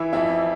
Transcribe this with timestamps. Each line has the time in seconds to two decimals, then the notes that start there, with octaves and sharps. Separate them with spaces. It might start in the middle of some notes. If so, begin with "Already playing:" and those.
Already playing: E3 E4 E5
0.13 F2 E4 E5